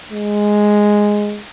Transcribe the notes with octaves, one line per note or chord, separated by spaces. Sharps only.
G#3